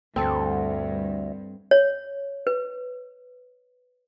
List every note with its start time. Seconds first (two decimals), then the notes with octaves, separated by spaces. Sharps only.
0.16 D2 G2 C4 A4
1.71 C#5
2.47 B4